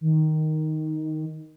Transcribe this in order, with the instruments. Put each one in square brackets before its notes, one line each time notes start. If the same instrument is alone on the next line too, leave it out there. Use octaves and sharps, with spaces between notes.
[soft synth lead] D#3